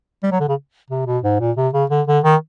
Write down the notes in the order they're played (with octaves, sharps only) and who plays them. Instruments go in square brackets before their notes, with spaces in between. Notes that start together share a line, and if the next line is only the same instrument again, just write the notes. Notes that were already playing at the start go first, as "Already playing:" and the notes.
[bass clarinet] G3
F#3
D3
C#3
C3
B2
G#2
A#2
C3
C#3
D3
D3
D#3